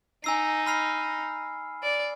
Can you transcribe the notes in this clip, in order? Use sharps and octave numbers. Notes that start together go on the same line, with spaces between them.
D#4 G#5 E6 C7
B5 F6 C7
D5